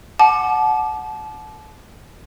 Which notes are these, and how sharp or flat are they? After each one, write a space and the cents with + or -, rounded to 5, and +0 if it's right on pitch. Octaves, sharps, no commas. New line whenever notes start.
F#5 -5 A5 -30 D6 +15